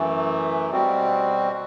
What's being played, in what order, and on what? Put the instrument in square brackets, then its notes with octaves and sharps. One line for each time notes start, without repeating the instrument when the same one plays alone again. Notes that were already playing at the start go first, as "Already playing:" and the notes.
Already playing: [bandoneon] F#2 E3 A3
B2 G3 C4 F#4